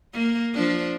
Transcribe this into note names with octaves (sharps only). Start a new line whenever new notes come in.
A#3
F3 D4